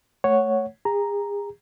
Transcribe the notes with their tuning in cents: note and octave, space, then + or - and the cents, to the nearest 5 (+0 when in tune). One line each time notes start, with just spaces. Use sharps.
A3 +0 C#5 +0 F#5 +0
G#4 -40 A#5 +0